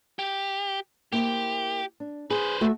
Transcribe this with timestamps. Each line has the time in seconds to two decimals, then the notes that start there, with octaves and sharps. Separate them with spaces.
0.19 G4
1.13 A#3 E4 G4 C5
2.00 D4
2.30 G#4 B4 C5
2.61 A3 F#4 E5